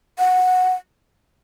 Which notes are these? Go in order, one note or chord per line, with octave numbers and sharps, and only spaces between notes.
F#5